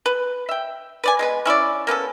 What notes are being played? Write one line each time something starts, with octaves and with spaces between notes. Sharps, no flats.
B4
E5 G5
B4 D5 G#5
G#3 B3 B4
C#4 E4 C5 D5
A#3 B3 C#4 A4